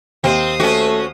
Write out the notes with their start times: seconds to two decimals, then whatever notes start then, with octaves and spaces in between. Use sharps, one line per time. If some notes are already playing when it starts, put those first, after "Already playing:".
0.24 D#2 C4 C5 D#6
0.60 A3 C#4 F#4